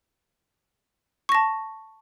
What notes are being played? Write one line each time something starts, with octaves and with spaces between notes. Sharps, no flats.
A5 C#6 A#6